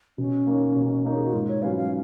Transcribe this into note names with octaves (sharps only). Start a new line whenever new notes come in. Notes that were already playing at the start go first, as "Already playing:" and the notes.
B2 C#4
A#3 D#4 A#4 C#5
B2
A#3 D#4 A#4 C#5
G#4
F#4
G#2 F4
C#5
F#3 C#4 F4 B4 F5
F5